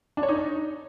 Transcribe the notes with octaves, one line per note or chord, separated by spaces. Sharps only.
D4
C#5
D#4